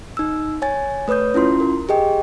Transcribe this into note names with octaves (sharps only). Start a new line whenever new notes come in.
D#4 E6
C#5 G#5 A6
A3 B4 C#5 D#6 G6
C#4 E4 F4 C6
A#4
G4 G#4 D#5 G5